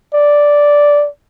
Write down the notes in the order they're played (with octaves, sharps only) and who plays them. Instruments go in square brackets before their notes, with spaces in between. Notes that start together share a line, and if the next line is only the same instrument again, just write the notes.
[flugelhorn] D5